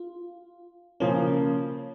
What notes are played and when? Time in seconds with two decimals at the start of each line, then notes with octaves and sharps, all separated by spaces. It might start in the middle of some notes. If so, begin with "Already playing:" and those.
Already playing: F4
1.00 C#3 F3 A#3 C#4